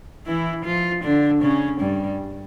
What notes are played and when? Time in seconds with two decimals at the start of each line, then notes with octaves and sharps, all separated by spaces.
0.27 E3 E4
0.65 F3 F4
1.04 D3 D4
1.42 C#3 C#4
1.81 G2 G3